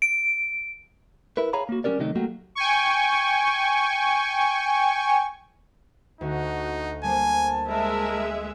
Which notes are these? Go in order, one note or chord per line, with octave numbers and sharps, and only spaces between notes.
D7
E4 A#4 B4
G#4 C#5 F5 A#5 B5
A#3 F#4
F#3 A3 C#4 G4 A#4 D5
C3 D#3 F#3 A3 D#4
F#3 A3 A#3 F#4 G4
G5 G#5 C#6
D2 D#4 F#4
G3 A#3 C5 G#5 A5
G#3 A#4 E5